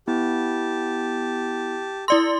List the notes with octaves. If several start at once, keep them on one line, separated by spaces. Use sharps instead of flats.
B3 E4 G4 A5
E4 A4 D5 C6